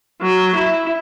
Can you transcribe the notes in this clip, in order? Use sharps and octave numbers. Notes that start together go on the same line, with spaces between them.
F#3
E4